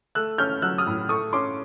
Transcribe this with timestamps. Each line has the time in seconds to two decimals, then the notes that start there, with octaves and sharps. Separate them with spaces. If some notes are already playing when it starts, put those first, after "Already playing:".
0.15 A3 E6 F#6
0.38 C#4 F6 G6
0.62 F#3 E6 F#6
0.78 D#6 F6
0.87 A2
1.09 A3 C#6 D#6
1.33 C#4 C6 D6